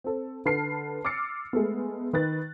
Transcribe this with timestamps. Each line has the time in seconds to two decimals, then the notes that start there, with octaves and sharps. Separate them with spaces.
0.04 C4 A4
0.45 D3 B4 A5 F6 C7
1.05 D6 E6 F6 A6 C7 C#7
1.53 G#3 A3 B3
2.13 D#3 B4 F#6 A6